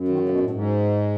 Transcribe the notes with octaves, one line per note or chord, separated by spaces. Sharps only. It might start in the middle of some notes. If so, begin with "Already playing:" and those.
Already playing: F#2
D#3
C#3
B2
A2
G#2